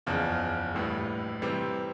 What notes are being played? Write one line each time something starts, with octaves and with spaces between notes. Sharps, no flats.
F#1 E2 C#3 F3
A#1 A2 E3 G3
C3 E3 G3 C4